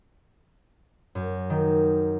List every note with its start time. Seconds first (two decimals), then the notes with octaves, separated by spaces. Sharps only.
1.15 F#2
1.50 D#3